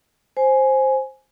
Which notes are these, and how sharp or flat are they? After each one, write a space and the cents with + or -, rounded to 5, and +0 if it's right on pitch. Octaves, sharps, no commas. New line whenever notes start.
C5 +10 G#5 +10